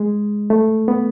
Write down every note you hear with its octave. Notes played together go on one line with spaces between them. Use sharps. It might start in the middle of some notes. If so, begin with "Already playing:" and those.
Already playing: G#3
A3
B3